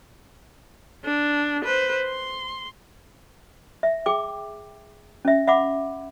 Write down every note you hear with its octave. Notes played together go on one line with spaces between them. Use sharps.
D4
B4 C5
C6
E5
G#4 G5 D6
C#4 E5
E5 F#5 B5 D6